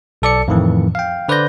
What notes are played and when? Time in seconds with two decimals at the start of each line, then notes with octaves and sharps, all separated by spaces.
0.22 B1 A4 D5 C#7
0.48 F2 A2 D#3 E3
0.95 F5 G5
1.28 D3 B4 C5 D5 G6 A#6